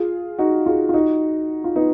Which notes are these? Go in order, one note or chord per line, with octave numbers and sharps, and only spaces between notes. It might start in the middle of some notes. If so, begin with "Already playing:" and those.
Already playing: F4 G#4
D#4 F#4
F4 G#4
F4
D#4 F#4
F4
B3 D#4